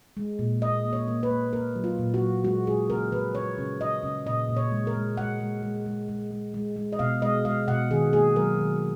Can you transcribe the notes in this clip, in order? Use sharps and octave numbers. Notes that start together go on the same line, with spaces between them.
G#3
A#2
A#3 D#5
A#3
C#5
A#3
B4
A#3
A#3 A#4
F#3
F4
A#2
F#4
F#3
G#3 F#4
G#3 G#4
C#3 A#4
F3 B4
F3 C#5
C#3
C#3 D#5
C#3
A#2 D#5
A#2
C#5
G#3
A#4
G#3
G#3 F#5
G#3
G#3
G#3
G#3
G#3
G#3
G#3
D#5
B2 F5
G#3 D#5
G#3 F5
B2 F#5
D#3 G#4
A#3 G#4
F#3 A#4
D#3